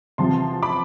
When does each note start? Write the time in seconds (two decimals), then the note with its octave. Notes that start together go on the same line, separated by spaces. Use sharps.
0.18 E2 C3 F3 A5 C6
0.63 B5 D6